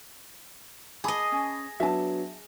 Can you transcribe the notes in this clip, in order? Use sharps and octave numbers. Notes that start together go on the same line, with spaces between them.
G#4 D#5 A5 B5 D6
C#4
F#3 B3 D4 E5 A5